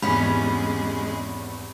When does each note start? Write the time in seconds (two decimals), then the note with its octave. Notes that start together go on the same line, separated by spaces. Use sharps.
0.02 G#1 E2 G3 G#3 B3 C#4 B5